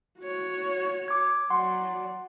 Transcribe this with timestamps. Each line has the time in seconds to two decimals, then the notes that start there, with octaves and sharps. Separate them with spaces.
0.20 F#4 C#5
1.08 D6 G#6
1.50 F#3 D5 F#5 C6